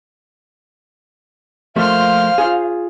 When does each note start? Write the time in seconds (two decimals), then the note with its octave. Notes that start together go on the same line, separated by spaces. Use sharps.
1.76 F3 A3 A#3 C5 F5 F6
2.38 F4 G#4